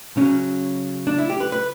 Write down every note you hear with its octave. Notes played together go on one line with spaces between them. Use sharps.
C#3 F#3 C#4
D4
E4
G4
B4
B4